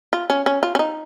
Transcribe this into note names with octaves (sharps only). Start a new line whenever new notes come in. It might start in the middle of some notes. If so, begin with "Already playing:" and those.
F4
C#4
C#4
F4
C#4
D#4